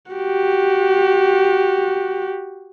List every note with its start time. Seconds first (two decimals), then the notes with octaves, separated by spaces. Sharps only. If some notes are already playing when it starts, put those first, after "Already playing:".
0.12 F#4 G4